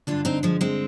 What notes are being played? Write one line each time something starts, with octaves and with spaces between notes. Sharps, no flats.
G2 D3 D4 F4
C4 D#4
F3 G#3
G#3 C4